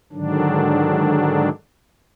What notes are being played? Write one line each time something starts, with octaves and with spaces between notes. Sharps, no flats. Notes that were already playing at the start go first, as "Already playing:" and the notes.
G#2 D3 D#3 F#3 D4